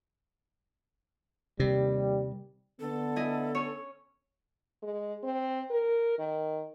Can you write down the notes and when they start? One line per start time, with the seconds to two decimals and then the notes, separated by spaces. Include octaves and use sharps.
1.60 D#2 C3 G3
2.80 D3 B3 A4
3.16 E4 D#5 G#5
3.55 C#4 C#5
4.82 G#3
5.23 C4
5.70 A#4
6.19 D#3